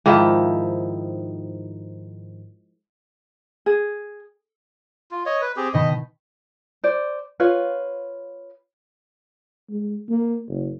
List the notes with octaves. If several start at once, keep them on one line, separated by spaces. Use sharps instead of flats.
G#2 D#3 F3 E4
G#4
F4
C#5 D#5
B4
C4 G4 G#4
B2 D#3 D#5 B5
C5 D5
F4 B4 C#5 F5
G#3
A#3
F#1